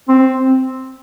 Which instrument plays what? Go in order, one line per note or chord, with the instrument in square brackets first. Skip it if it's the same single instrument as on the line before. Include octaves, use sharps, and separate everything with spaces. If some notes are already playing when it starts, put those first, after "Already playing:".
[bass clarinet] C4